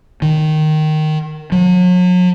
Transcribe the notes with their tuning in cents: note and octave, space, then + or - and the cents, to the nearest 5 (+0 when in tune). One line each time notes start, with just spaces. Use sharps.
D#3 -10
F#3 -40